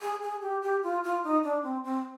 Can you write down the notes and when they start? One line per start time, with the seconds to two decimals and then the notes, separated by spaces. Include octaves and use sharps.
0.01 G#4
0.22 G#4
0.42 G4
0.62 G4
0.83 F4
1.04 F4
1.24 D#4
1.44 D4
1.63 C4
1.84 C4